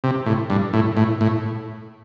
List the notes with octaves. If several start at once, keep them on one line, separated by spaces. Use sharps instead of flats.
C3
A2
G2
A2
A2
A2